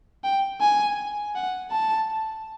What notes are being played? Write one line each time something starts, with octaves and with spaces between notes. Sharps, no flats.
G5
G#5
F#5
A5